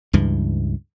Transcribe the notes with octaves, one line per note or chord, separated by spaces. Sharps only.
C#2 G2 E3